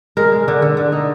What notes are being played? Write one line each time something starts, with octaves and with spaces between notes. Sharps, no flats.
G#3 A#4
G#3
D3
D3
D3
D#4